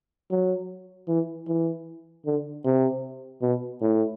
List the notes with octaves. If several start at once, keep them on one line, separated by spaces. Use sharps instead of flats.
F#3
E3
E3
D3
C3
B2
A2